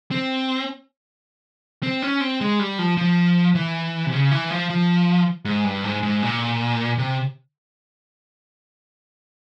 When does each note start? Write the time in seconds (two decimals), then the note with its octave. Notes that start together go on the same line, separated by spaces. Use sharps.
0.11 C4
1.83 C4
2.02 C#4
2.21 C4
2.41 G#3
2.59 G3
2.79 F3
2.97 F3
3.55 E3
4.06 C3
4.12 C#3
4.31 E3
4.51 F3
4.70 F3
5.45 G#2
5.65 G2
5.84 G#2
6.03 G#2
6.23 A#2
6.98 C3